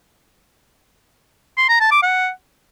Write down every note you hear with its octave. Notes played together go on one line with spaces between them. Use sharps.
C6
A#5
A5
D6
F#5